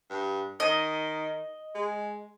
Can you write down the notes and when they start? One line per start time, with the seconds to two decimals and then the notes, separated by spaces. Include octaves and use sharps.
0.10 G2
0.60 D#3 D#5
1.75 G#3